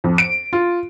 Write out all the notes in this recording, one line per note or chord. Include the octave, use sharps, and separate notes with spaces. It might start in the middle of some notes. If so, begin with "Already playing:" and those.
F2
D7
F4